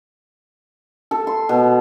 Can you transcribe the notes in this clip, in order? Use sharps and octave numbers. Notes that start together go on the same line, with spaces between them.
A4
C6
B2